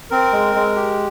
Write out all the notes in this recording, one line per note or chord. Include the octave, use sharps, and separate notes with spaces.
C4 A#4
G#3
G#3
G4